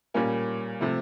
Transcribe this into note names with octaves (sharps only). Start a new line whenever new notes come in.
A#2 G3 A#3 C#4
C3 F3 A3